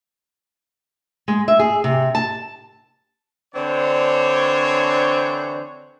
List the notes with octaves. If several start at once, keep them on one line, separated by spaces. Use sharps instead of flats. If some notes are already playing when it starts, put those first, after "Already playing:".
G#3
E5
G#4
C3
A5
D3 E3 C4 D4 C5 C#5